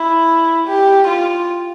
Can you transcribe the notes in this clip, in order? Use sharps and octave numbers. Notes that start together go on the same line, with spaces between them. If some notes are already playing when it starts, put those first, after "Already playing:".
Already playing: E4
G4
F4